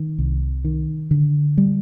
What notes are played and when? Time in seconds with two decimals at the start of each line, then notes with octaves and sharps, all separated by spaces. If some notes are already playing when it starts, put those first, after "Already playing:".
Already playing: D#3
0.19 C2
0.65 D#3
1.11 D3
1.58 G3